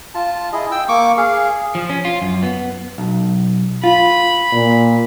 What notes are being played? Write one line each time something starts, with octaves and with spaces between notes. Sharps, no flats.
F4 A5
E4 G#4 D#5
G5 E6
A#3 C#6 D6
G#4 F5
F3
C#4
F4
F#2
B3
B1
F4 B5
A#2